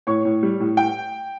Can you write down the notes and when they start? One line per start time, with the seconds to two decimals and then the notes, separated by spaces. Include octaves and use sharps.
0.07 A2 C#5 C#6
0.25 A2
0.43 G3
0.60 A2
0.77 G5